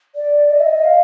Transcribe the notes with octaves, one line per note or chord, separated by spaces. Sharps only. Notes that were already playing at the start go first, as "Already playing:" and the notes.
D5
D#5
E5
D#5
F5